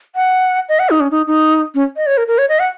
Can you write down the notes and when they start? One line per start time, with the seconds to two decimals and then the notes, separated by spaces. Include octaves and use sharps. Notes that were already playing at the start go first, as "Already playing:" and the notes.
0.15 F#5
0.69 D#5
0.79 F#5
0.90 D#4
1.00 C#4
1.11 D#4
1.27 D#4
1.75 C#4
1.96 D#5
2.07 C#5
2.17 A#4
2.28 A#4
2.38 C#5
2.49 D#5
2.59 F#5